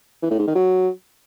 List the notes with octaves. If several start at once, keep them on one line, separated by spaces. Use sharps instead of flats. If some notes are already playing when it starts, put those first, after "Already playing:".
E3
A2
G#2
D#3
F#3